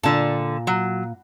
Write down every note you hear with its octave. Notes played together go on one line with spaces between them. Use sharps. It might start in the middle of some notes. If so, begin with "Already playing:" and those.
A#2 D3 A5
F#3